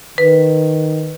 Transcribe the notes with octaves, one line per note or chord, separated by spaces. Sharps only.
D#3 B4